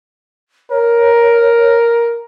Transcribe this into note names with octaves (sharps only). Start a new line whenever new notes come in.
A#4 C#5